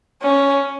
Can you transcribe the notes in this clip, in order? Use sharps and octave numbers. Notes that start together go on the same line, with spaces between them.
C#4